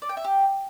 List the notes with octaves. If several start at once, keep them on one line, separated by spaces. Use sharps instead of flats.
D5
G5
E5
G4